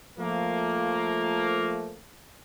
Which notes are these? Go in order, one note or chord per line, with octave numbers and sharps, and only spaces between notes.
F3 A3 A#3